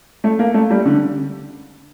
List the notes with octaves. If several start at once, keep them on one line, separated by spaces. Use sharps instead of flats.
A3
A#3
A3
G3
D3